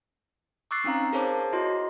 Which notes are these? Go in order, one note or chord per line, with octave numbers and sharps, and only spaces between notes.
C#6 D6 E6 F#6 A6 C7
C4 C#4 D#4 F5 A#5
G#4 A#4 C5 C#5 A5 D6
E4 F#4 D#5 C6